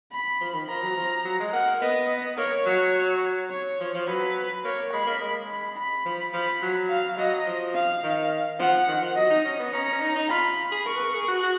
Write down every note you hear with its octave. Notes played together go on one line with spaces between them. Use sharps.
B5
F3
D#3
F3 A#5
F#3
F3
F#3
G#3
A#3 F#5
A#3
B3 D#5
A#3 C#5
F#3
C#5
F3
F3
F#3 B4
A#3 C#5
G#3 B5
A#3
G#3
B5
B5
F3
F3 B5
F#3
F5
F#3 D#5
F3
F5
D#3
F3 F#5
D#3
F3
F#3 D#5
D#4
C#4
B3
C#4 A#5
C#4
D#4
D#4
F4 B5
G#4
A#4 C#6
B4
A#4
G#4
F#4
F#4